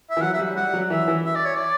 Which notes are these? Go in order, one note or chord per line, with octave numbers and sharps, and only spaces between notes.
E5
E3
F#3 F#5
E5
G3
G3 F#5
F#3
E3 E5
E3
E5
D5
C#5
D5